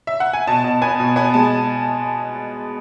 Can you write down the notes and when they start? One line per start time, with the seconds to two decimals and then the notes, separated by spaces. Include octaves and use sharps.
0.07 E5
0.20 F#5
0.33 G#5
0.47 B2 A5
0.64 B2
0.82 B3 G#5
1.00 B2
1.16 B3 G#5
1.34 G#3 A5